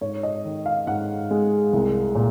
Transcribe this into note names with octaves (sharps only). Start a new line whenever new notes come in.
G#2 C#5
D#5
D#3
F5
G#2 F#5
G#3
C2
A#2